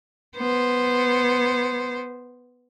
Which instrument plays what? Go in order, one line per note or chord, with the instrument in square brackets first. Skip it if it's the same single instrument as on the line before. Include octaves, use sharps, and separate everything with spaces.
[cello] B3 C5